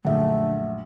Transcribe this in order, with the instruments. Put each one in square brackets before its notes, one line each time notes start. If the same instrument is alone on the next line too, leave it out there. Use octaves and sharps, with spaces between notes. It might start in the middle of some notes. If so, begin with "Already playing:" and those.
[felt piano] A#1 F#2 [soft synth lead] D3 [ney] A3 [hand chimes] E5 F#5